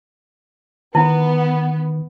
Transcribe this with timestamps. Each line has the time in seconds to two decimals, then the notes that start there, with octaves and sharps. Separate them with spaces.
0.95 D#3 B3 E4